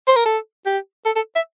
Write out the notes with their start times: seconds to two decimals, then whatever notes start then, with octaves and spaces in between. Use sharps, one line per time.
0.07 C5
0.16 A#4
0.26 A4
0.66 G4
1.05 A4
1.16 A4
1.35 E5